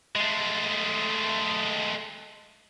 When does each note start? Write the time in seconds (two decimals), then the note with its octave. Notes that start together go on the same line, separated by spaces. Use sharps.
0.16 G#3 A3